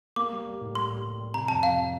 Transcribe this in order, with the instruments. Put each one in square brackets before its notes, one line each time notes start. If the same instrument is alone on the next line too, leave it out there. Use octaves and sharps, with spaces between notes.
[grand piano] A#3 [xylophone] D6
[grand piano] G3
G3
A2
[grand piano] G3 [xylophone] C6
[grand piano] G3
G3
G3
[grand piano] C3 [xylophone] A#5
[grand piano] F2 [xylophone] A5
[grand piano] C3 [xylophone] F5
[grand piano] F3